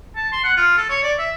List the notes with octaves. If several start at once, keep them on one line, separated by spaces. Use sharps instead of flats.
A5
C6
F#5
F4
A4
C#5
D5
E5